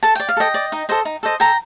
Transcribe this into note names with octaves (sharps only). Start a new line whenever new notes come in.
A4 A5
D5 G5
F5
A4 D#5 G5
D5
D#4
A4 C5 D#5
D#4
A4 C5 D#5
A4 G5 A#5